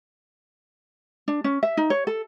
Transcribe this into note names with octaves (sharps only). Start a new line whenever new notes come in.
D4
C#4
E5
D#4
C#5
A4